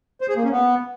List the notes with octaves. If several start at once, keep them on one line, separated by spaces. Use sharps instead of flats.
C5
G#4
A#3
C#4
B3